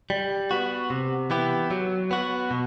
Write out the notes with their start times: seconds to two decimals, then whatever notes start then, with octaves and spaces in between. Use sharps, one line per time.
0.10 G3
0.51 B3 F#4
0.90 C3
1.30 E3 B3 E4 G4
1.71 F#3
2.11 B3 F#4
2.51 B2